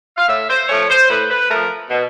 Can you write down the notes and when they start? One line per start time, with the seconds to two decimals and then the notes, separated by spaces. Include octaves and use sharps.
0.17 F5
0.28 A2 E5
0.49 C5
0.69 F3 A3 C#5
0.90 C5
1.10 A2 B4
1.30 B4
1.50 F3 A3 A#4
1.90 B2